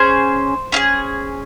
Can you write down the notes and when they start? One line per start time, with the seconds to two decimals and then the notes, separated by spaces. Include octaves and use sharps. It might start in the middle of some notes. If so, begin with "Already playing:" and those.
Already playing: C#4 G#4 C5
0.72 C#4 F4
0.76 G#4